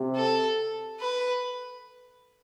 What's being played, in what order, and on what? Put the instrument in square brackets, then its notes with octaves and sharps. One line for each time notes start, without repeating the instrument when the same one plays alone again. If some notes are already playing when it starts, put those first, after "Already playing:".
Already playing: [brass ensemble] C3
[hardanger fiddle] A4
B4